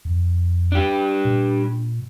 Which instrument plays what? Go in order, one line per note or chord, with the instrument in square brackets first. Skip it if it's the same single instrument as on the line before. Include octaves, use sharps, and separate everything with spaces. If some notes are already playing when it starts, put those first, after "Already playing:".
[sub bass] F2
[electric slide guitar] D4 G4
[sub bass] A#2